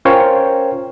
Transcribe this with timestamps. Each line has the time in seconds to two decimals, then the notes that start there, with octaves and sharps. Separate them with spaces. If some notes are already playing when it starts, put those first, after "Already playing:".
0.05 C#4 F4 A#4 C5 C#5 G5